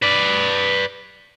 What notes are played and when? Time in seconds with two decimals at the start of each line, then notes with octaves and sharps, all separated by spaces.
0.02 B4 D5